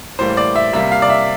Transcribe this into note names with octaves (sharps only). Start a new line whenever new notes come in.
A2 E3 G3 A#3 C5
D5
E5
C3 G3 A#3 E5
F5
D5
E5